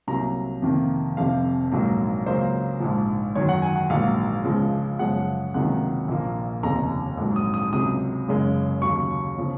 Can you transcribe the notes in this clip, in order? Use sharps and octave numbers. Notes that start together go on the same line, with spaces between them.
C2 C3 F#3 A#3 A#5
F2 C3 D#3 A#3
F1 F2 C3 F5
A#1 G#2 F#3 A#3
C#2 C#3 F#3 A#3 C5
A#1 G#2 F3
F#2 D#3 F#3 C#5
F#5
G#5
F#5
A#1 G#2 F#3 A#3 F5
C#2 C#3 F3 G#3
F#2 C#3 F3 G#3 F#5
C#2 C3 D#3 F#3 A#3 F#5
A#1 A#2 F3 A#3
F1 D#2 C#3 A#5
A#1 G#2 F#3
D#6
D#6
C#2 C3 F#3 D#6
F#1 F#2 C#3 G#3
D#2 C#3 F#3 C#6
C#3 F3